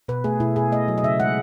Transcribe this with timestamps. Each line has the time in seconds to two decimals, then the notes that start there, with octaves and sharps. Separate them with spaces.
0.08 B2 B4
0.24 A3 G#4
0.40 B2 E4
0.56 B2 G#4
0.72 A3 D#5
0.88 F#3
0.98 D#5
1.03 C#3 E5
1.20 G#3 F#5